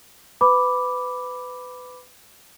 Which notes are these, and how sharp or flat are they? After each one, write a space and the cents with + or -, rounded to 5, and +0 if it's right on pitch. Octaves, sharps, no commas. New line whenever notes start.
B4 +25 B5 +0 D6 +0